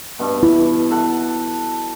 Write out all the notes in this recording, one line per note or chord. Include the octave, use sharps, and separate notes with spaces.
G2 B2
E4
A4 F#5